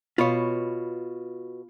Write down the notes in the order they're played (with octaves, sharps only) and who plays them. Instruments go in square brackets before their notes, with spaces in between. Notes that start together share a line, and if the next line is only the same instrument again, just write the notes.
[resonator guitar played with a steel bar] B2 [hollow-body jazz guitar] F4 C#5